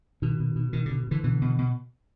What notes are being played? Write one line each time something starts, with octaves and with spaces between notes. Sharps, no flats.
B2 D#3
B2
B2
B2 D#3
D3
B2
B2
D3 E3
B2 D3 E3
B2
B2